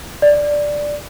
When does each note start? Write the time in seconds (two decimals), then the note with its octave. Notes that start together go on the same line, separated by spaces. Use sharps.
0.22 D5